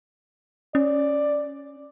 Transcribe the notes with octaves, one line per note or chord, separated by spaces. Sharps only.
C#4 D5